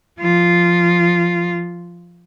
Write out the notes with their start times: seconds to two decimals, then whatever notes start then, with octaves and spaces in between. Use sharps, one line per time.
0.20 F3 F4